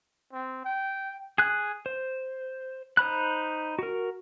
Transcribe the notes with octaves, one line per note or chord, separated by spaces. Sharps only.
C4
G5
G#4 F#6
C5
D#4 C5 B5 F#6
F#4 A#4